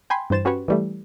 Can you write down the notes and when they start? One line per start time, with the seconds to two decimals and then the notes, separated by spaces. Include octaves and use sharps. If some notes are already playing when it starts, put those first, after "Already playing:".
0.10 G5 G#5 B5 C6
0.30 G2 E3 C5 A6 E7
0.45 C#4 F#4 G4 B4 C#5
0.68 E3 G3 A3